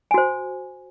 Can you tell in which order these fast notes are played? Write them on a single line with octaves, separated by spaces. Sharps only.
G#5 F#4 C5